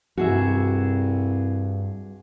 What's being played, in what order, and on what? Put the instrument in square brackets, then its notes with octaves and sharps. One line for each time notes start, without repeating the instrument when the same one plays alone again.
[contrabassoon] C2 [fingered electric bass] G2 [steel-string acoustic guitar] F#4 G#4 E5